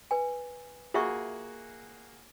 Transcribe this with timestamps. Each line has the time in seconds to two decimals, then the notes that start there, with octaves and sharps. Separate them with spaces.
0.11 B4 G#5
0.94 A#3 F4 F#4 G#4 E5 C#6